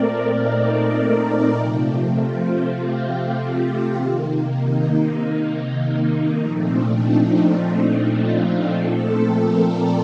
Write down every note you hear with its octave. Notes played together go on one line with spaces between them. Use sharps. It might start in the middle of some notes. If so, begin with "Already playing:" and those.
Already playing: A#2 A3 C4 A#4 D5
D#4
C3 F3 A3 C4
F4
G4
C3 D#3 A#3
D#4
D#4
D#4
A#2 F3 A3 C4 D#4
D4
D#4
D#4
F4
A#2 F3 A3 C4 A4
A#4
D5